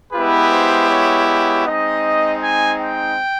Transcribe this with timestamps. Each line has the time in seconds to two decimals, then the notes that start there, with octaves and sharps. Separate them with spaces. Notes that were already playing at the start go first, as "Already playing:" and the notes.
0.12 G#3 B3 E4 G4 B4
0.52 C5
0.90 C#5
1.27 C#5
1.66 G#3 C4 D#4 D#5
2.43 G#5
2.82 G5